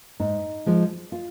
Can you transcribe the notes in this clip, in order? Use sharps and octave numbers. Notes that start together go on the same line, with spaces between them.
G#2 D#4
F3 G#3
F4